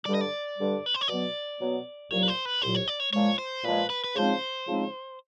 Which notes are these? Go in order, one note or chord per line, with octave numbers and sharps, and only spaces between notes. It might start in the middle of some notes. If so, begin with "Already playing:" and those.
G2 D3 G3 D5
D#5
D5
G2 D3 G3
B4
C5
C#5
B2 F#3 B3 D5
B2 F#3 B3
C2 A#2 F#3 C#5
B4
C5
B4
C2 A#2 F#3 C5
C#5
D5
C#5
A#2 F3 G#3 C#5
C5
A#2 F3 G#3 B4
B4
B4
C#3 F3 G#3 C4 D#4 C5
C#3 F3 G#3 C4 D#4